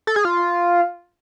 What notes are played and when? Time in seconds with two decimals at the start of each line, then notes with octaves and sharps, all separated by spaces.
0.07 A4
0.16 G#4
0.25 F4